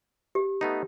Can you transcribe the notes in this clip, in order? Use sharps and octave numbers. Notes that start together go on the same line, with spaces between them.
G4
A3 B3 D#4